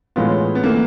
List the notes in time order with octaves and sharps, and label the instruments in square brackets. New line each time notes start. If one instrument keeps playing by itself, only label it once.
[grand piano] A2 E3 G#3 C#4 F4 [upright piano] B3
[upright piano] B3
[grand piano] E3 A3 [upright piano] A#3